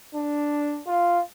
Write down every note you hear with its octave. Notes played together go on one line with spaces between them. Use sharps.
D4
F4